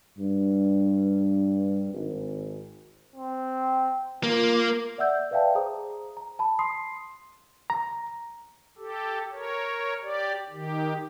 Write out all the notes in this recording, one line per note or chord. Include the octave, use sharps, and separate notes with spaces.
G2
G#1
C4
A#3 F4
D5 E5 F#5 E6 G6
B4 D5 E5 F5 G5 A5
G#4 C5 A#5 D#6
A#5
A5 B5
C6 D#6 C7
A#5
G4 A4
A#4 C#5
G4 D5
D#3 G4